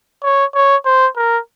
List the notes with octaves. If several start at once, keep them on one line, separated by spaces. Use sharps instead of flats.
C#5
C#5
C5
A#4